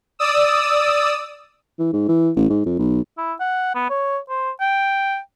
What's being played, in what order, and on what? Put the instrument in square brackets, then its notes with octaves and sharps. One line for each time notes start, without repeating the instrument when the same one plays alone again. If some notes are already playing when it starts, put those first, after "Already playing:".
[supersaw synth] D5 D#6 E6
[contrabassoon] E3
G#2
E3
A1
G#2
F2
B1
[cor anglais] E4
F#5
B3
C#5
C5
G5